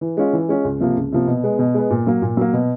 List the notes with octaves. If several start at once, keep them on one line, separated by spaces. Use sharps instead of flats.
E3
G#3 C#4 F4
E3
G#3 C#4 F4
C#2
C3 F3 A#3
C#2
C3 F3 A#3
B2
G#3 B3
B2
G#3 B3
A#2
F#3 A#3
A#2
F#3 A#3
B2